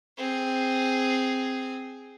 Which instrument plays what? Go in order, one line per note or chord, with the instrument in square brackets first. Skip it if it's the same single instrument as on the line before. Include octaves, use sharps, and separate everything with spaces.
[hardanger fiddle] C4 G#4